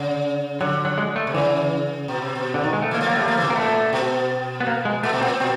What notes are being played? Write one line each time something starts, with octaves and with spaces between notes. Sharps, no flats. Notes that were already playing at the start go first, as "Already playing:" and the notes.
Already playing: C#3
D3 F#3
F#3
G#3
A3
C3
C#3 E3
B2
C3
B2
D3
D#3
G#3
A3
E3 A#3
F3
F#3 A#3
G3 A3
F3 A#3
C3 E3
B2 A#3
A#2 A3
B2
B3
A#3
G#3
A#2 A3
B2
A#2 C4
B2 C4